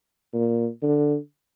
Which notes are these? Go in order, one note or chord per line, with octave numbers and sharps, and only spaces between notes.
A#2
D3